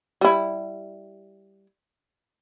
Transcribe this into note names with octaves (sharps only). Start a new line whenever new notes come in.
G3 E4